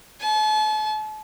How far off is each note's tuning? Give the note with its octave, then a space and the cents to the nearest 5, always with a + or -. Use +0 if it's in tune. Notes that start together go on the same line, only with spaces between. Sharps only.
A5 -40